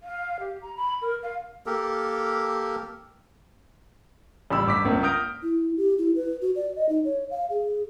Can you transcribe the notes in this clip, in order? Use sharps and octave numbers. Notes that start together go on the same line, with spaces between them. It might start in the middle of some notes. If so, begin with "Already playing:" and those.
F5
G4
A#5
B5
A#4
F5
A#3 G4 A4 A#4
A1 G3 B5 E6
G1 D6 B6
G1 C#2 A#3
D#6 F6 G6 A#6 D7
E4
G4
E4
B4
F#4
D5
D#5
D#4
C#5
F5
G#4